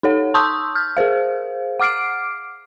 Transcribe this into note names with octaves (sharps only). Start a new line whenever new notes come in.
D#4 A4 C#5 F#5
A5 C6 C#6 D#6 E6 G6
F6 G6
G#4 A#4 C5 F5
F#5 D6 F6 C7 D7